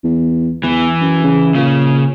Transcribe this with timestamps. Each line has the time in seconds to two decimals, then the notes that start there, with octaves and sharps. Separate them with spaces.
0.04 E2
0.64 E2 E3
1.01 F#2
1.23 C#3
1.55 A#2 C#3